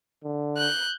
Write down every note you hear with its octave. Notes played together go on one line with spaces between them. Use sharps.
D3
F#6 G6